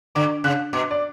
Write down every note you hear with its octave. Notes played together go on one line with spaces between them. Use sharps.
D3 D6
C#3 F#6
B2 D6
D5